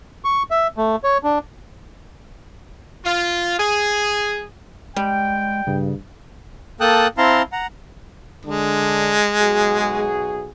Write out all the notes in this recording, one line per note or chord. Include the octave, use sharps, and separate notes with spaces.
C#6
E5
A3
C#5
D4
F4
G#4
G3 G#3 G5
G2 C#3
A#3 A4 G5 A5 D#6 F#6
C4 E4 F5 A5 A#5 C6
F#5 A#5
D3 G#3 D4
B1 F#4 G#4